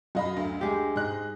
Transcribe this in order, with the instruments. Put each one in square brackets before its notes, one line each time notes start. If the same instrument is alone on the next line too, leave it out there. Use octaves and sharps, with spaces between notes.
[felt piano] F#2 F5 [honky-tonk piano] F#4 D#5 B5
[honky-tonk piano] D2
[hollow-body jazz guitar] G#3 G4
[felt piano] G#2 [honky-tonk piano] D#5 F#6